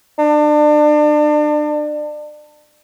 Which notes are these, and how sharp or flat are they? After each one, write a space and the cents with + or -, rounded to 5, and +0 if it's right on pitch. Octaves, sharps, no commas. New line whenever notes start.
D4 +30